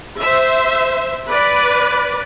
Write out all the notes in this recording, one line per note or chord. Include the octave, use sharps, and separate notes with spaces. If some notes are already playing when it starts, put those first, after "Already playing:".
C5 E5
B4 D5